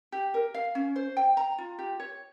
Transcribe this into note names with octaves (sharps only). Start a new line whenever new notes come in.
G4
A#4
F5
C#4
C5
G5
A#5
F4
G4
C#5